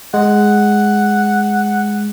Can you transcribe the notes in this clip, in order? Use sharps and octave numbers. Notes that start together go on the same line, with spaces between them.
G#3 F#5